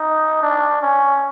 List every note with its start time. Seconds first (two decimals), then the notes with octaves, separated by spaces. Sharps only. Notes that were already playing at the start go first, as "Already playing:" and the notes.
Already playing: D#4
0.42 D4
0.82 C#4